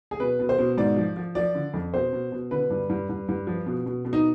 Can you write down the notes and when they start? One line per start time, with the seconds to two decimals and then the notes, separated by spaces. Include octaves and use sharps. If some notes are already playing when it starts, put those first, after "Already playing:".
0.11 G#4
0.20 B2 B4
0.39 B2
0.49 C5
0.58 B2
0.77 G#2 D5
0.97 F3
1.17 F3
1.35 F3 D5
1.55 D3
1.74 F2
1.94 B2 C5
2.13 B2
2.32 B2
2.51 D3 B4
2.70 G2
2.89 G2
3.09 G2
3.28 G2
3.47 F3
3.66 B2
3.86 B2
4.05 B2
4.13 D#4